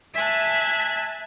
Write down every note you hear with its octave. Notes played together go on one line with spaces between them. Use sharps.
E5 G#5 A5 F#6